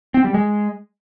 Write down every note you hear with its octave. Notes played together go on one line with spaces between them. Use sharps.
C4
G3
G#3